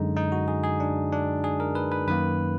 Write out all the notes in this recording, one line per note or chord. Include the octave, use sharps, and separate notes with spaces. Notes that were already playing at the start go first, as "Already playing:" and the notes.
Already playing: F#2 D3 G#3 D#4
D#4
F#4
G#4
G#4
D4
D4
G#4
A#4
B4
B4
F#2 D#3 A#3 B4